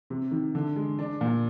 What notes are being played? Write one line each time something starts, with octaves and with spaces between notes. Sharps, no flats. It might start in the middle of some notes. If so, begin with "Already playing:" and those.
C3
D#3
D3
G#3
D4
A#2